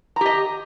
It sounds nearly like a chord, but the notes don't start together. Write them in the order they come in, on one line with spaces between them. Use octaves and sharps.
A#5 G4 D#5